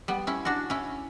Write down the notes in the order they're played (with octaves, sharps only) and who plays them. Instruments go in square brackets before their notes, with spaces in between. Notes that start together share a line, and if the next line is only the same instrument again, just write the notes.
[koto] G3 B3
C#4 E4
D4 F#4
C#4 E4